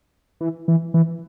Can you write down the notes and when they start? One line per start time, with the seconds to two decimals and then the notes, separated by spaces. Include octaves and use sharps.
0.41 E3
0.68 E3
0.94 E3